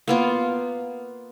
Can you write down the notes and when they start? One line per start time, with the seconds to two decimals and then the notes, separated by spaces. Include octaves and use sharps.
0.08 A#3 B3 F4